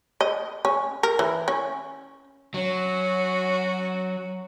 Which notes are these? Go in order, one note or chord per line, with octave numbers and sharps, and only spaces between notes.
D#5
C#4
A#4
E3
C#4
F#3 C#4 F#4